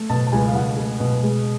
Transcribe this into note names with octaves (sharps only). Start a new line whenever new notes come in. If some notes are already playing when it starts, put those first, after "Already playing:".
Already playing: A3
B2 A5
A5
C#2 G#5
F5
C#2 F#5
A3
B2
G#3